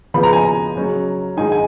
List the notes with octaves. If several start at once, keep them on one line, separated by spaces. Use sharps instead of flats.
C#3 F3 B3 B5
A#5
G#5
A#5
C#3 F#3 C#4
G#2 D#3 G#3 D#4 G#5
G#5